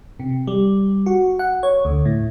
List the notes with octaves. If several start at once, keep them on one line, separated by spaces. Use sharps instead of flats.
C3
G3
F#4
F#5
C#5
D2
A2